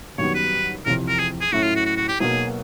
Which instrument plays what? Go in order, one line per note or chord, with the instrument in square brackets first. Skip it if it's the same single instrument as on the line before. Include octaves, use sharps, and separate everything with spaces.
[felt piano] F#2 D#3 G3 B3 [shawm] C#5
[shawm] B4
[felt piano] F2 C3 E3 [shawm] A#4
[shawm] A#4
G#4
G#4
[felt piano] A2 F#3 A3 C#4 E4 [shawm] F#4
[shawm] F4
F#4
F#4
F#4
G4
[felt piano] B1 B2 F#3 A#3 [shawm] G#4